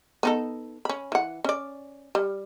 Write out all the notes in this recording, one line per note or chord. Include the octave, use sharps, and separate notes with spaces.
B3 D#4 A4
C#4 B5
E3 F#5
C#4 D5
G3